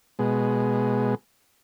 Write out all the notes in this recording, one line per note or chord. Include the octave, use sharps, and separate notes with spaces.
B2 G#3